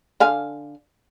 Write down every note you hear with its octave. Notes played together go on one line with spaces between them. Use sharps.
D3 F5 G#5